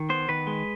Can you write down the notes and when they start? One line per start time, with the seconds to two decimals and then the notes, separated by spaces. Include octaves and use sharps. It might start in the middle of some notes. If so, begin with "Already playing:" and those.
Already playing: D#3
0.09 B3 C5
0.29 D#3 B4
0.47 G#3